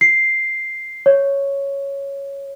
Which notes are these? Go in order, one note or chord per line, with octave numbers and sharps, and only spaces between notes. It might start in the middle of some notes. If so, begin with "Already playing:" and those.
C7
C#5